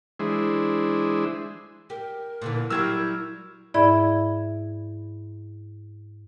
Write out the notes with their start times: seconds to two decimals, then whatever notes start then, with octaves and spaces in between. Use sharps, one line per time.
0.20 E3 G#3 D4 E4 G#4 C5
1.90 G4 A#4
2.42 A#2 D3 E3
2.70 F#3 G3 E4 F4 E6 F6 G#6
3.74 G#2 E4 D5 E5 B5 G#6